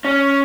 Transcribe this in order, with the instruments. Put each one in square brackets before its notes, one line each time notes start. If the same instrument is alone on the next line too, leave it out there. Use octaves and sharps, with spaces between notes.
[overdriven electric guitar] C#4